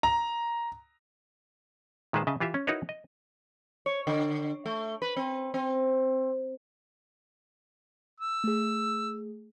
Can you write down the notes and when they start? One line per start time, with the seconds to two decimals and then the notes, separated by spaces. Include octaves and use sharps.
0.03 A#5
2.13 A#2 D#3 G#3 B4 C5 A5
2.27 C#3 D#5 E5 A5
2.40 E3 F4 G4 E5
2.54 C#4
2.67 D#4 E4 F#4 A#4 B4 C#5
2.89 D#5
3.86 C#5
4.07 D3
4.66 A3
5.02 B4
5.16 C4
5.54 C4
8.20 E6
8.44 A3 G#4